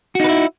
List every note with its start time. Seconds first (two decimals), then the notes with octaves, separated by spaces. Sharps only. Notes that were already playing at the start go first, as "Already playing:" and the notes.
0.15 F#4
0.20 D#4
0.24 B4
0.29 E4